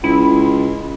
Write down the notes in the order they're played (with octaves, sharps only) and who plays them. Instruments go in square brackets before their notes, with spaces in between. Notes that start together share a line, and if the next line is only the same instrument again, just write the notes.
[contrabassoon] C#2 [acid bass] E4